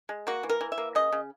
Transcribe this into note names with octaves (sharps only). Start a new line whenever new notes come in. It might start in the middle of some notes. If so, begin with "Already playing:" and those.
G#3
A#3 F#4
E3
A#4
E3
E5
A#3
C#3 D#5
C#3